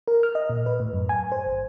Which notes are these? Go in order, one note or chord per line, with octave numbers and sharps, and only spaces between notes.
A#4
F6
D#5
A#2
B4
A2
F#2
G#5
C5
G1